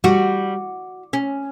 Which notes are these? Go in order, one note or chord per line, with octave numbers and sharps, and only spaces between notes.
G3 F#4
C#4